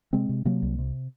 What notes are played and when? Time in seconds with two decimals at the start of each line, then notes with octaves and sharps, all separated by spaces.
0.13 C3 G#3 C4
0.29 C3
0.45 C3 F#3 A#3
0.62 C2
0.78 C3